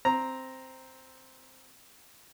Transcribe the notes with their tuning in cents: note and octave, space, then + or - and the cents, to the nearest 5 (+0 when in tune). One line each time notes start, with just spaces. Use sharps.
C4 +0 A#5 +0